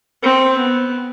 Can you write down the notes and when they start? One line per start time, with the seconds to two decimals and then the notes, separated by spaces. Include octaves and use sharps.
0.22 C4
0.58 B3